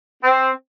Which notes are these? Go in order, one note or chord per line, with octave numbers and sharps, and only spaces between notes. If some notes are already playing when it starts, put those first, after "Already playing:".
C4